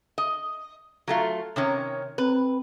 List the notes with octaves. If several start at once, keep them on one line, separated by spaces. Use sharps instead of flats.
D#5
F#3 A3 F4
C3 D#3 C#4 C#5
C4 B4